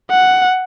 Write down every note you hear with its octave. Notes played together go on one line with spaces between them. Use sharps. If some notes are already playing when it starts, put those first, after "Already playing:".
F#5